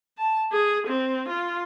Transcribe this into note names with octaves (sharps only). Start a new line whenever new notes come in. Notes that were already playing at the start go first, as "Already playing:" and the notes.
A5
G#4
C4
F4